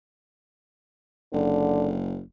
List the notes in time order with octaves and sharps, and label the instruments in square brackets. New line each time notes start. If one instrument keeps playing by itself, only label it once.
[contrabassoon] F#1 [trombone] D3